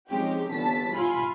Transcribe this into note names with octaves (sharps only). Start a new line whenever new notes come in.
F3 G#3 C4 C#4 D#4 G4
G1 E3 A5 B6
E4 F4 G#5 B5 C6